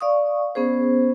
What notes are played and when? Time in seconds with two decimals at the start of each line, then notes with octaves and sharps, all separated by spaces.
0.01 D5 F5 C#6 D#6
0.55 B3 C#4 G#4 C5